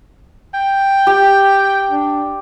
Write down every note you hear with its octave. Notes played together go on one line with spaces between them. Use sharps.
G5
G4
D4